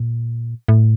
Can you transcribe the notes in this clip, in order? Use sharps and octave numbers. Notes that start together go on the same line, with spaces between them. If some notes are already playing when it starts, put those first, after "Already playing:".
Already playing: A#2
A2